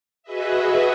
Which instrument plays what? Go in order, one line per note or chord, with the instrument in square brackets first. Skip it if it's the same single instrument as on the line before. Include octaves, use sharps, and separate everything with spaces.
[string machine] F#4 G#4 B4 D#5 E5